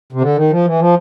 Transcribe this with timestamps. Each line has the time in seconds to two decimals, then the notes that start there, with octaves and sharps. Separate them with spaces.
0.13 C3
0.21 D3
0.36 D#3
0.51 F3
0.65 E3
0.80 F3